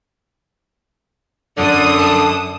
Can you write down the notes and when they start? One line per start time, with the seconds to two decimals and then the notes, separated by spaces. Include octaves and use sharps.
1.58 F#2 D3 D5 D#6
1.99 A5